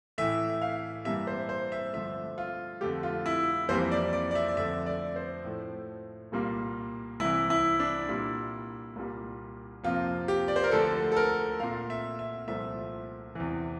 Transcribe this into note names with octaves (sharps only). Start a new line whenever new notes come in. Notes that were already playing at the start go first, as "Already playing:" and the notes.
A2 E3 A3 E5
F5
G2 E3 G3 A#3 E5
C5
C5
E5
G2 D3 F3 A3 E5
F4
F2 D3 A3 G4
F4
E4
F2 E3 G3 A#3 C5
D5
D5
D5
E5
D5
F2 D3 A3 E5
D5
C5
A2 F3 A3
C2 A#2 G3 A#3
C2 C3 E3 E4
E4
D4
A#2 G3 A#3 E4
C2 A#2 G3 A#3
F2 C3 F3 A#3 F4
G4
D5
C5
A#4
D2 D3 F3 A3 A4
A4
A#4
A#2 A3 F5
E5
E5
C2 A#2 F3 A3 E5
E2 C3 E3